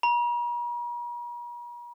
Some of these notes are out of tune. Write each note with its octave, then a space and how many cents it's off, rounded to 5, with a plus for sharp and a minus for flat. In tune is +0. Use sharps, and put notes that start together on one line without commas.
A#5 +45